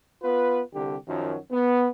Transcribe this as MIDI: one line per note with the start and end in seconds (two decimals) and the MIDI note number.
0.22 0.62 59
0.22 0.62 65
0.22 0.62 71
0.74 0.96 36
0.74 0.96 50
0.74 0.96 67
1.08 1.36 42
1.08 1.36 51
1.08 1.36 53
1.08 1.36 54
1.52 1.88 59